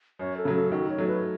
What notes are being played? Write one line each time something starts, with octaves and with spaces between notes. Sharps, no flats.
F#2 C#5
A4
C#3 F#3 A3
A4
D#3 F#4
C#5
F#3 A3
B4